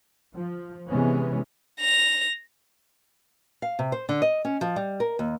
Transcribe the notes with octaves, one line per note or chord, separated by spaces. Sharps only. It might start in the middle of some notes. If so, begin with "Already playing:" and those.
F3
C3 E3 G#3 B3 C#4
A#6 F7
F5
C3
C5
D3
D#5
C#4
F3
G3
A#4
D#2